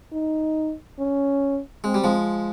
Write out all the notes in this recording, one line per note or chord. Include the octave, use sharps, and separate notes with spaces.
D#4
C#4
G#3 C4
G3
F3 G#3